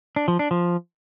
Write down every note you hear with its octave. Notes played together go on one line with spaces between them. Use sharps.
D4
F3
D4
F3